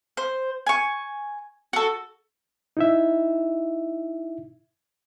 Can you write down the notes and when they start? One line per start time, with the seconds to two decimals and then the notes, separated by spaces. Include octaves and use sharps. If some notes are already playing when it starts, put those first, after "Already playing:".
0.17 C5
0.67 G#5 C#6
1.73 F#4 A4
2.77 D#4 E4 E5